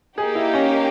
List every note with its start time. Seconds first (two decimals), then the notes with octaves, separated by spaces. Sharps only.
0.18 A#3 D#4 G4 G#4
0.35 E4
0.54 C#4